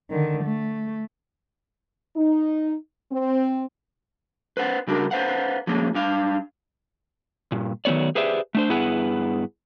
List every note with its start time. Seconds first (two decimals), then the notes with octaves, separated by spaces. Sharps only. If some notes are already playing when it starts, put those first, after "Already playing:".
0.10 D3 D#3
0.44 A3
2.15 D#4
3.11 C4
4.57 B4 C5 F#5
4.87 C#3 G3 D4 F#4 G#4 A#4
5.11 B4 C5 F5 F#5
5.67 F3 G#3 A#3 C#4
5.94 G2 D4 F5
7.52 G2 A#2
7.85 D#3 F#3 A3 B3 C#5 D5
8.15 G4 G#4 B4 C5 D5 E5
8.55 A3 D4 C5
8.69 G2 B3 E4 G#4 B4 F#5